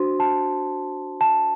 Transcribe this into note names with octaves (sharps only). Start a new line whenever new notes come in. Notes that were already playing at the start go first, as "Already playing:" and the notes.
Already playing: D4 F#4 C5 C6
A5
A5